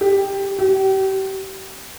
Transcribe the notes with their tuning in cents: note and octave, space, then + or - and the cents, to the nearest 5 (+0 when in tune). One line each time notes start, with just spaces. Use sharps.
G4 +10
G4 -35